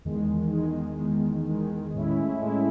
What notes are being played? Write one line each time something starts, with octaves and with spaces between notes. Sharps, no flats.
E2 D#3 G#3
E2 D#3 G#3
E2 D#3 G#3
E2 D#3 G#3
A2 G#3 C#4 E4
A2 G#3 C#4 E4